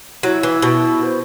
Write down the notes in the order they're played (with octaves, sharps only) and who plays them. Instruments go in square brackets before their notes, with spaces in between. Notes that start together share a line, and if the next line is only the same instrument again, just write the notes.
[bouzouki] F#3 [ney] E4
[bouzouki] E3
B2
[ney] C5